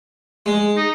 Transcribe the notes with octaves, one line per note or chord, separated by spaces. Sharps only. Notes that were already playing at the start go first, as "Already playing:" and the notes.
G#3
D#4